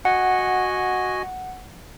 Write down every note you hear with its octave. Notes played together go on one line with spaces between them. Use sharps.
F#4 D#5 F#5 G#5